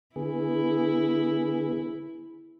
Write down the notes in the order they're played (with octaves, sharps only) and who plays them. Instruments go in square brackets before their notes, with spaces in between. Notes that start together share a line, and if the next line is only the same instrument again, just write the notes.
[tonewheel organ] D3 B3 G#4 [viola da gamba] E4